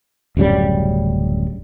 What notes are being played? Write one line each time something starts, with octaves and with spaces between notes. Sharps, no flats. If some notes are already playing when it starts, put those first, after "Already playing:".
D1 F#2 C#3 G3